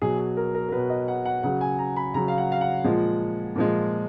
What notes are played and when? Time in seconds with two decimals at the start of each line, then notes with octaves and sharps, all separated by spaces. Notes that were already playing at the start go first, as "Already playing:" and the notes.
0.02 B2 F#3 G#4
0.19 G#4
0.37 A#4
0.55 A#4
0.69 A#4
0.72 B2 F#3 B4
0.90 D#5
1.08 F#5
1.25 F#5
1.43 C#3 F#3 F#5
1.61 G#5
1.79 A#5
1.96 B5
2.14 C#3 F#3 A#5
2.28 F5
2.38 F#5
2.52 F5
2.61 F#5
2.84 A#2 F3 G#3
3.56 A#2 F3 G#3